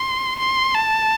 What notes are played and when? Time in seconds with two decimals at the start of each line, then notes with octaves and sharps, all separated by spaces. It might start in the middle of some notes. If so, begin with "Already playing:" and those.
Already playing: C6
0.39 C6
0.75 A5